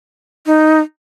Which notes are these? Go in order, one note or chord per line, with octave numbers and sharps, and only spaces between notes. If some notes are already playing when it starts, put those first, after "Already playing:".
D#4